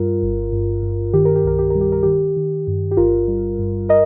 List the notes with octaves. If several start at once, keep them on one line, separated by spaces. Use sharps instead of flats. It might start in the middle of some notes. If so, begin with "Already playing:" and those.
Already playing: G2 G3 F4 A#4
G1
G2
G2
D#3 G4
A#4
G4
C2 A#4
G4
G3 A#4
G4
A#4
D#3 G4
D#3
G2
G4
G1 F4 A#4
G3
G2
A#4 D#5